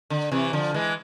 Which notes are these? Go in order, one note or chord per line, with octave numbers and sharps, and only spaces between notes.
D3
C3 E3
D3 F3
E3 G#3